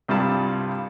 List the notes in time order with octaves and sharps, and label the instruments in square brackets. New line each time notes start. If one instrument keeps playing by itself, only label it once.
[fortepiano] C2 G2 G3 F4 A5